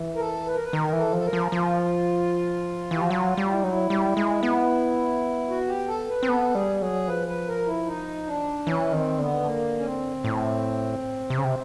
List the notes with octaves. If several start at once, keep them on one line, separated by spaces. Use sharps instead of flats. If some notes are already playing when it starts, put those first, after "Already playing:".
Already playing: E3
A#4
A4
B4
A#4
B4
D#3 A#4
E3
A4
F3
A4
A#4
F3
F3 F4
E3 G4
F3 F#4
F#3 F4
G3
E4
F#3 D#4
E4
G3
G#3
B3
F#4
G4
A4
B4
C4
B3 A4
G3 G#4
F#3 G#4
F3 B4
B4
A#4
E4
D#4
D4
E3 C#4
D#3 C4
D3 B3
A3
A#3
C#4
C4
A2
C3
C#3
C3